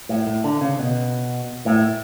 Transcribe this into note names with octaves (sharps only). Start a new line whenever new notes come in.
A2
A2
D3
C#3
B2
A2